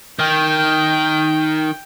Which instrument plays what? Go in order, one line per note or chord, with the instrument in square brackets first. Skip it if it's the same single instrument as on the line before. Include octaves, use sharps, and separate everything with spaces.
[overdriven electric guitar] D#3 [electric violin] G5